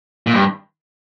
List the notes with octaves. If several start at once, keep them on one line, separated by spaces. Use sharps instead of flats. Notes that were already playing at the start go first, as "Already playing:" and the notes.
A#2
G2